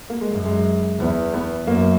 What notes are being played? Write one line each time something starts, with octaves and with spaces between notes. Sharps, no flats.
A#3
G#3
F#2
G#3
E2 B3
B3
F#2 A#3